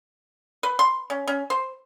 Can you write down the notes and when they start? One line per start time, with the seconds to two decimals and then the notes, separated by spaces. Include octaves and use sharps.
0.63 B4
0.79 C6
1.10 C#4
1.27 C#4
1.50 C5